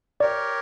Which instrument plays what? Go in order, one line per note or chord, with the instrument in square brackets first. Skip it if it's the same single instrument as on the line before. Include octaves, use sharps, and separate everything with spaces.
[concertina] G4 A#4 C#5 [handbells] D5